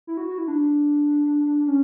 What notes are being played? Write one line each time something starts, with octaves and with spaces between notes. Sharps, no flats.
E4
F#4
F#4
E4
D4
C#4